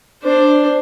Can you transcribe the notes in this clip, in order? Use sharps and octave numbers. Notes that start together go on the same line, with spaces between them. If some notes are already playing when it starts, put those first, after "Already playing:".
D4 C5